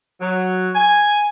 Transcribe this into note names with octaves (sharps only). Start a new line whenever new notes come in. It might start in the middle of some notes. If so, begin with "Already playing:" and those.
F#3
G#5